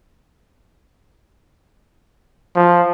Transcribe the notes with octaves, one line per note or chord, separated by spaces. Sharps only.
F3